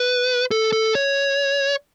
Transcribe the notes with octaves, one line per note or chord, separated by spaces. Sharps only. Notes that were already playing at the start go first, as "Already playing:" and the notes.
Already playing: B4
A4
A4
C#5